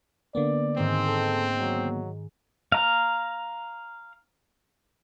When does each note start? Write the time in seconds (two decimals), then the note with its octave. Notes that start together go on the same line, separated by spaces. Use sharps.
0.35 D3 A#3 B3 D5
0.76 G#2 D#3 G#3 C4
1.08 A4
1.60 F#3
2.72 F5 A#5